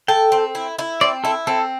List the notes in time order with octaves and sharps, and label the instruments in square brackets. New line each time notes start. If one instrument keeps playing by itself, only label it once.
[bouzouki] A4 [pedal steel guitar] G5
[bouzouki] C4
E4
E4
[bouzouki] C4 [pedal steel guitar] D5
[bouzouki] E4 [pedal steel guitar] A4
[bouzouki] C4 [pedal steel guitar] A4